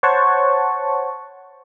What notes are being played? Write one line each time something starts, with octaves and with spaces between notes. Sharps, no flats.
C5 C#5 F#5 A5 C#6